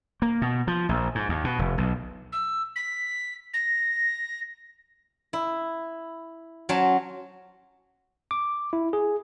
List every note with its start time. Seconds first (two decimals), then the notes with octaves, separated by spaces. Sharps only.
0.22 A#3
0.42 B2
0.67 F3
0.89 A#1
1.15 G#2
1.29 D#2
1.44 B2
1.59 F1
1.78 B1
2.32 E6
2.76 B6
3.53 A#6
5.33 E4
6.69 F#3 C#4 C5 G#5 A5
8.31 D6
8.73 E4
8.93 G#4